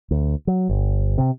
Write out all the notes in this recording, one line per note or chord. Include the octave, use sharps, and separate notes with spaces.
D2
F#3
G1
C3